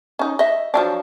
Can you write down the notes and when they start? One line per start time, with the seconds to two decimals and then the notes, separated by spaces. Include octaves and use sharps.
0.19 C#4 D#4
0.39 D#5 E5
0.74 F3 F#3 D4